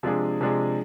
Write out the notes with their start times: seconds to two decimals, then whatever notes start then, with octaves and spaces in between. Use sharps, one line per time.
0.03 C3 F3 G#3 D4 G#4
0.41 C3 F3 G#3 D4 G#4